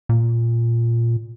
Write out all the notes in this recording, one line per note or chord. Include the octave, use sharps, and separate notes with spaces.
A#2